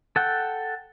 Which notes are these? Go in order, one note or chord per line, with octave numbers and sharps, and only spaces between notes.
A4 F#5 G5